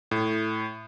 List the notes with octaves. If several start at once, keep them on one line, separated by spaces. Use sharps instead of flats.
A2